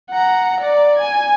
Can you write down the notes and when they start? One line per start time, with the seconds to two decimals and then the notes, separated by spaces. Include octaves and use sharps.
0.10 F#5 A#5
0.60 D5
0.97 G#5 G#6